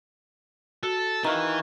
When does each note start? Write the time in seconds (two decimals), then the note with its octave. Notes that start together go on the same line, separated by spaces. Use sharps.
0.83 F#4 A4
1.24 D#3 E3 F5 A#5 C#6